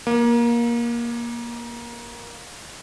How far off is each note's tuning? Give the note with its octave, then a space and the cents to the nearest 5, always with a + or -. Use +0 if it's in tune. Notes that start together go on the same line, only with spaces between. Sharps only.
A#3 +20